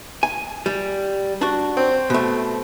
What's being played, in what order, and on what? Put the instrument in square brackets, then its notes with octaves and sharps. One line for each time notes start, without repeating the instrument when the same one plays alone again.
[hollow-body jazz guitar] G#5
G3
D4 F#4
[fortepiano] C4
[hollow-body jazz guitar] B2 A3